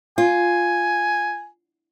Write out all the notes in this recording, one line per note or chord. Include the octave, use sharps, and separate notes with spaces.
F4 G#5